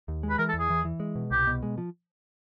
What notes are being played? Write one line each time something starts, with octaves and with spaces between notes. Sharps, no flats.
D#2
G#3
B4
E3 A#4
A4
E2
G#4
E3
E3
G#3
B2
C2 G4
B2
G#3
F3